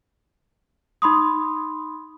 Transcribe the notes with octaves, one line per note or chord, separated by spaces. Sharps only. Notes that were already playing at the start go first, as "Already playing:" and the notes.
D#4 B5 C6 D#6